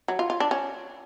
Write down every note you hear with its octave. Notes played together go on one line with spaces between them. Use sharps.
F#3
F4
F4
D4
C#4